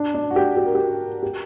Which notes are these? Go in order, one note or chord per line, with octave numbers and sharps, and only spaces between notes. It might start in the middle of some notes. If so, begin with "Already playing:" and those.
Already playing: D4
D4
F#4
G4
G4
A#4
G4
G4